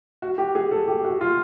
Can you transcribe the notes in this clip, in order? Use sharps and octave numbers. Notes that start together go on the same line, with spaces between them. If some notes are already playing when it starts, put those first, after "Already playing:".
F#4
G4
G#4
A4
G4
F#4
F4